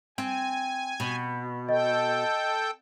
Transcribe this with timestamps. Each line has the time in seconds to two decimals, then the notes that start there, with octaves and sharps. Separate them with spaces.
0.18 C4 G#5
1.00 B2
1.69 A4 D#5 G5